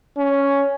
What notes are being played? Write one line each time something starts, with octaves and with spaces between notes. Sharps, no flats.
C#4